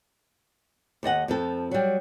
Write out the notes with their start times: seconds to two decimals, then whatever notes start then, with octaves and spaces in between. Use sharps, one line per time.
1.03 D#2 A4 D#5 F#5
1.28 F2 F3 A4
1.71 F#3 G3